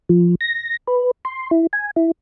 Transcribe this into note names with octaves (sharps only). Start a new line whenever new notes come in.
F3
A#6
B4
C6
E4
G#5
E4